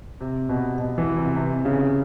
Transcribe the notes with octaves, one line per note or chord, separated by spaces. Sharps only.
C3
B2
B2
E3
C3
C3
C#3